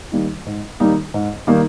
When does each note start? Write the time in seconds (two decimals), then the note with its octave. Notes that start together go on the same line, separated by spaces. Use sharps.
0.12 D#3 G3 A#3 D#4
0.46 G#2
0.80 D#3 G3 A#3 D#4
1.14 G#2
1.47 D#3 G3 A#3 D#4